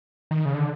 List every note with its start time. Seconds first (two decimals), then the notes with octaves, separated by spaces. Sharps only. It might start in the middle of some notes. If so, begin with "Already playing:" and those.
0.31 D#3
0.45 C#3
0.54 D3